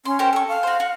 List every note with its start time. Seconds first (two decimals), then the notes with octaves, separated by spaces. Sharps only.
0.05 C#4 C6
0.19 G4 A#4 C5
0.33 A4 C#6
0.48 F5
0.63 F#4 C5
0.80 F#4